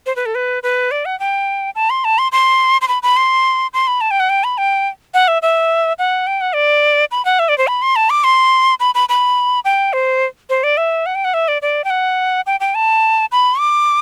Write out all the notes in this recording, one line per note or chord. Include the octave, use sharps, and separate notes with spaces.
C5
B4
A4
B4
B4
D5
F#5
G5
A5
C6
A5
C6
C6
C6
B5
B5
C6
C6
B5
A5
G5
F#5
G5
B5
G5
F#5
E5
E5
F#5
G5
F#5
D5
B5
F#5
E5
D5
C5
B5
C6
A5
D6
C6
B5
B5
B5
G5
C5
C5
D5
E5
F#5
G5
F#5
E5
D5
D5
G5
F#5
G5
G5
A5
B5
D6